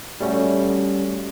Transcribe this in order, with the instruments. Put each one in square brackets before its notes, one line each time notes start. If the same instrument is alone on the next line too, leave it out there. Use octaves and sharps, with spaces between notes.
[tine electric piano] G3 A3 C#4 F#4